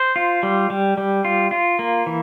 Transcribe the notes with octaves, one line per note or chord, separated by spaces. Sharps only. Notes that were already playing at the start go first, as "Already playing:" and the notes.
Already playing: C5
F4
G3
G3
G3
F4
F4
A#3
E3